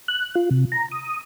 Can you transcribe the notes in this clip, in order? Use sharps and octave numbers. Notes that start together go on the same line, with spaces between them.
F#6
F4
C3
A#5
D#6